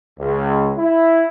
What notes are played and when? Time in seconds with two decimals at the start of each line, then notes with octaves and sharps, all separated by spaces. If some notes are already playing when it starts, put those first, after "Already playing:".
0.19 C#2
0.77 E4